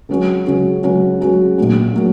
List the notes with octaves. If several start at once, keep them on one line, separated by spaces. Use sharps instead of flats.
C#2 C#3 F#3 C#4 F#4
C#2 C#3 F#3 C#4 F#4
C#2 C#3 F#3 C#4 F#4
C#2 C#3 F#3 C#4 F#4
A#1 A#2 F#3
A#2 F#3